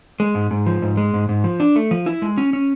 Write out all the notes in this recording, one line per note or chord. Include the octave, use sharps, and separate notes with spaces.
G#3
G#2
G#2
F3
G#2
G#3
G#2
G#2
F3
D4
A3
F3
E4
G#3
C#4
C#4